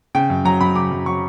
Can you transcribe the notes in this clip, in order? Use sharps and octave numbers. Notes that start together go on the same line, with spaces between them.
C#3 G5
F#2
F#3 A#5
F#2 B5
C#3 D6
F#2
F#3 C#6